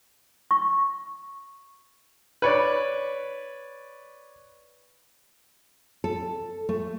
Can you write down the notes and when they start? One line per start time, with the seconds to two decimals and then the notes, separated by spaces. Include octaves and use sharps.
0.51 C#6
2.42 B4 C#5 D5
6.04 A4
6.69 A3